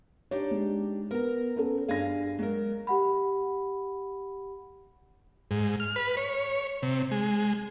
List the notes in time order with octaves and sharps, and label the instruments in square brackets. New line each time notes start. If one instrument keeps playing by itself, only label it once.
[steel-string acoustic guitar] D4 D#4 G4 [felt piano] C#5
[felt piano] G#3
[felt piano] B3 [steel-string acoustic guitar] A#4 A#5
[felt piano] B3 C#4 A4
[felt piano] G2 A#6 [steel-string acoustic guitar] G#4 F5
[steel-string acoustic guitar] F#3 A#4 [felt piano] G#3
[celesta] G4 F#5 B5
[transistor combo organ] G#2
F6
B4
C#5
C3
G#3